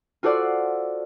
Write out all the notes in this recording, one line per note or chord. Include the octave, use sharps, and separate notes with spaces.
F4 F#4 A4 C5 D5 F#5